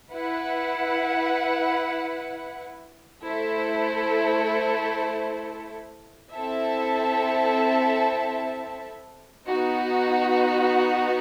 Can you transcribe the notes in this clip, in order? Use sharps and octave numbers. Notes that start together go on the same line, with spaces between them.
E4 B4 F#5
A3 E4 A4 C5
C4 E4 A4 E5 A5
B3 D#4 F#4